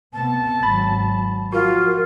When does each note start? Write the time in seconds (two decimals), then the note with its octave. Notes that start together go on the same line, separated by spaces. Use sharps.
0.14 C3 B3 A5
0.63 G#1 F#3 B5 A6
1.52 F3 F4 F#4 A#4